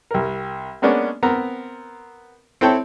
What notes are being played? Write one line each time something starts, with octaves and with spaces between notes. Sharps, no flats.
C2 A#4
G#3 A#3 B3 C#4 D4
B3 C4 A#4 A#5
C4 E4 A4 C#5 G5 A5